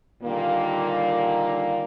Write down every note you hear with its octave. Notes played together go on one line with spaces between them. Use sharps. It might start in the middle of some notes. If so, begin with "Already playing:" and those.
A#2 D3 D#3 G3 A#3